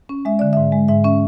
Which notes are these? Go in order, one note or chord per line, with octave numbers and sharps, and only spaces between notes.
C#4
G#3 E5
D3 D5
G#2 E5
G#3
G#2 E5
C#4 E5